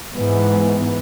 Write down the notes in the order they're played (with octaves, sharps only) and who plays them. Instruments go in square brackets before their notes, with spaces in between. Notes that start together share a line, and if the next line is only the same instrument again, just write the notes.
[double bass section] G#2 E3 B3